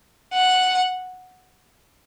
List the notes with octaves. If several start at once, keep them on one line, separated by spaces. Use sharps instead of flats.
F#5